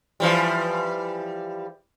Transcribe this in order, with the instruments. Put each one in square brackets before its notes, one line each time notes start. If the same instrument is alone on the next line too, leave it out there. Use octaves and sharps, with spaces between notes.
[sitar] E3 F3 G3